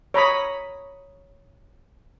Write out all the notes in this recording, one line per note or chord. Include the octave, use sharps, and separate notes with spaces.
C#5 A#5 B5 D#6